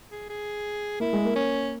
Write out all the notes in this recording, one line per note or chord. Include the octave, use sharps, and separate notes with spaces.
G#4
G#4
A#3 E4
G#3
A#3
C#4